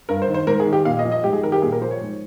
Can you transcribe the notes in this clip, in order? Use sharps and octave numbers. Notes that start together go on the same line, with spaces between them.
G2 A#4
C5
D#3
C5
G#2 A#4
G#4
D#3
G4
A#2 F5
D#5
F3
D#5
G#2 G4
G#4
D#3 A#4
G4
A#2 G#4
A#4
F3 C5
C#5
G#2